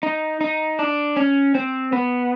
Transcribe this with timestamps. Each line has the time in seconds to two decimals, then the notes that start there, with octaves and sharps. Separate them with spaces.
0.03 D#4
0.41 D#4
0.79 D4
1.17 C#4
1.55 C4
1.93 B3